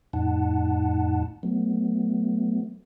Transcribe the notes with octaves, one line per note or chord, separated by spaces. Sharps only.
F2 A2 D#4 F#5 A5
F#3 A3 B3